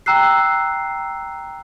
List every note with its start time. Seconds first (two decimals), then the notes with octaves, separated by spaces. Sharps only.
0.06 G5 A#5 E6 F#6 C7